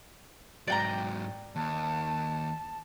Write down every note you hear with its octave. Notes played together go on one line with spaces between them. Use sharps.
G#2 F#3 D5 G5 A#5
D#2 A5